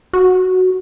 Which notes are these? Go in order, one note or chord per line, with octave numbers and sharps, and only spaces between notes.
F#4